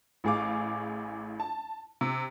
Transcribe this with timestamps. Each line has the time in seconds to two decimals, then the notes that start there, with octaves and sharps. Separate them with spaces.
0.24 A1 A2 G#4 F5 D6
1.40 A5
2.01 C3